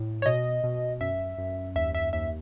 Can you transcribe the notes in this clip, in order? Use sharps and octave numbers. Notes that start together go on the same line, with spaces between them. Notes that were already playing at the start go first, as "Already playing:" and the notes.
Already playing: A2
C#5
B2 D#5
B2
F#2 E5
F#2
D#2 E5
E5
D#2 E5